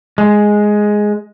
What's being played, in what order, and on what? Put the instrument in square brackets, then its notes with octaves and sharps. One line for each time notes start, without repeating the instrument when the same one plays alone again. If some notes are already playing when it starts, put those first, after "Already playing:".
[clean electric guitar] G#3